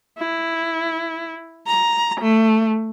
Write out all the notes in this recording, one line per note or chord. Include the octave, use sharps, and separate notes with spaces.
E4
A#5
A3